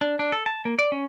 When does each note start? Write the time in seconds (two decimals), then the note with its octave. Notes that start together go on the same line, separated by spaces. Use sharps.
0.01 D4
0.19 D4
0.32 A4
0.46 A5
0.65 A#3
0.79 D5
0.92 C#4